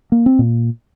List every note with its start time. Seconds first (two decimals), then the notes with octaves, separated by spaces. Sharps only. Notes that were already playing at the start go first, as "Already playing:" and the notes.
0.12 A#3
0.26 C4
0.39 A#2 A#3